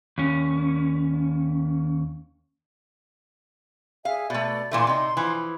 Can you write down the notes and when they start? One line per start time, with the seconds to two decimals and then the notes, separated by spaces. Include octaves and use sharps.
0.18 D#2 C#4
4.05 G#4 E5 F5 G#5
4.30 B2 A3 D5
4.71 A#2 E3 A3 C6
4.87 C3 D#4
5.17 E3 F3